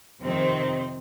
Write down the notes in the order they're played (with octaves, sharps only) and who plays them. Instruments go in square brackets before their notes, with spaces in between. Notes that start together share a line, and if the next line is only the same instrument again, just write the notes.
[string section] F2 C3 D#3 C4